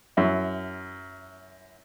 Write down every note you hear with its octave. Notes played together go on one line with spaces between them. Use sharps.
F#2 E4